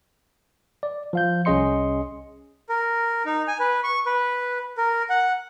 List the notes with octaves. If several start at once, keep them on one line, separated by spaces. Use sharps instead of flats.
D5
F3 F5 G6
C2 C#4 G#4 D#5 C6 C#7
A#4
D#4
G#5
B4
C#6
B4
A#4
F#5